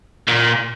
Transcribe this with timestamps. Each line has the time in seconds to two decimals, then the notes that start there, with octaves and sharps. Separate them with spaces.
0.28 A#2